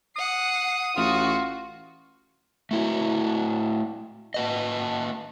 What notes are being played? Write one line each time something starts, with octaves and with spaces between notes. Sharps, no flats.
F#5 D#6 C7
A1 F4 F#4
A3 E4 F#4
A#3 B4 D#5